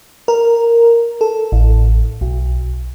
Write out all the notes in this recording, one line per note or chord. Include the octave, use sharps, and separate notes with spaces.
A#4
A4
A1
B1